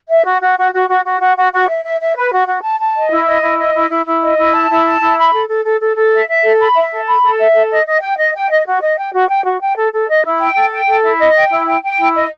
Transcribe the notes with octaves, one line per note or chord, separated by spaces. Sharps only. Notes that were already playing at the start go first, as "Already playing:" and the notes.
E5
F#4
F#4
F#4
F#4
F#4
F#4
F#4
F#4
F#4
E5
E5
E5
B4
F#4
F#4
A5
A5
D#5
E4
D#5
E4
D#5
E4
E4
E4
D#5
E4
A5
E4
A5
E4
B5
A4
A4
A4
A4
A4
E5
E5
A4
B5
E5
A4
B5
A4
E5
A4
D#5
D#5
G5
D#5
G5
D#5
F#4
D#5
G5
F#4
G5
F#4
G5
A4
A4
D#5
E4
G5
A4
G5
A4
E4
D#5
G5
E4
G5
G5
E4
D#5